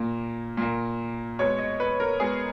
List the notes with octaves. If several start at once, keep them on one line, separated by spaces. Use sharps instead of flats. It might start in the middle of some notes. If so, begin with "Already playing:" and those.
Already playing: A#2 A#3
A#2 A#3
B2 G#3 B3 C#5
D#5
B4
A#4
B2 G#3 B3 G#4